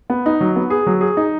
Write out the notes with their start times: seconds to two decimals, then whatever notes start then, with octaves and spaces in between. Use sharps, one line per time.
0.10 B3
0.26 D#4
0.41 F#3
0.56 B3
0.70 G#4
0.87 F#3
1.01 G#4
1.17 D#4